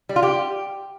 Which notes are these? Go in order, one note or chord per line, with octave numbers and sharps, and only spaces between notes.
G3
F4
G4